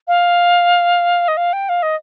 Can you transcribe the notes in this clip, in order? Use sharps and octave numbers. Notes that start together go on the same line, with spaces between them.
F5
D#5
F5
G5
F5
D#5